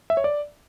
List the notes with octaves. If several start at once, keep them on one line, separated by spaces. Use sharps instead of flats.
E5
C#5
D5